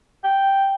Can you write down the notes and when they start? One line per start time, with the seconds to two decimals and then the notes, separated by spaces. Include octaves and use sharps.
0.24 G5